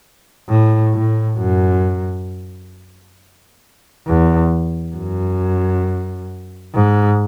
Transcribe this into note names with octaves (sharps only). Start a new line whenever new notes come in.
A2
A2
F#2
E2
F#2
G#2